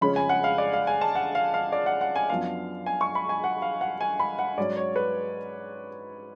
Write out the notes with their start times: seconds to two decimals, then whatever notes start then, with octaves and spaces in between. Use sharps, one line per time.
0.01 F2 C#3 G#3 C#4 B5
0.16 G#5
0.29 F#5
0.44 F5
0.58 D5
0.73 F5
0.87 G#5
1.01 A5
1.15 F#5
1.35 F5
1.54 F5
1.72 D5
1.86 F#5
2.01 F#5
2.16 G#5
2.29 F#2 F3 B3 D4 F5
2.86 G#5
3.01 C#6
3.15 B5
3.29 G#5
3.44 F#5
3.62 F5
3.81 F#5
4.01 G#5
4.19 B5
4.39 F#5
4.57 G#2 F#3 C#4 D5
4.77 C#5
4.96 B4